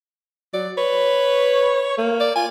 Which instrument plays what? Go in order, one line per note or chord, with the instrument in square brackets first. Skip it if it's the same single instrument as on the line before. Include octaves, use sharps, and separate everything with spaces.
[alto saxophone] F#3 [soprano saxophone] D5
[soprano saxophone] B4 [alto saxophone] C#5
[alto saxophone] A#3
[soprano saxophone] D5
[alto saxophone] F4 [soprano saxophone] G#5